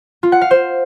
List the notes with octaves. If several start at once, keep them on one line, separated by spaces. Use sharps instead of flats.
F4
F#5
F5
C5